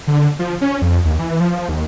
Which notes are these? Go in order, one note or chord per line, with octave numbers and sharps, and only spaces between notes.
D3
F3
C#4
F2
D#2
E3
F3
D#2